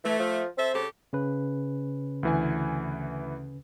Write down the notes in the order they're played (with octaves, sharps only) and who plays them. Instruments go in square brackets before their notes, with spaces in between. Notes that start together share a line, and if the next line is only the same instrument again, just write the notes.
[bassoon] E3 [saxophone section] A3
[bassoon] F3
[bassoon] C4 [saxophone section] A4 E5
[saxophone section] C#3 G4 A4
[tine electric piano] C#3 C#4 B4
[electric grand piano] D2 E3 G#5